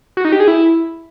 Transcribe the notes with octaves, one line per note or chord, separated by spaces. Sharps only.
F#4
D#4
G4
G#4
E4